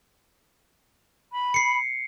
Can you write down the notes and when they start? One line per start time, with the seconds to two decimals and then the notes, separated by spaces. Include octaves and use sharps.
1.32 B5
1.54 C7 C#7